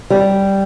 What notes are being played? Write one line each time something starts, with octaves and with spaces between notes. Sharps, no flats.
G3